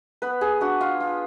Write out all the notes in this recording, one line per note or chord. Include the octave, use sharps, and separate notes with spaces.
B3 B4
G#4
D4 F#4
F4
F4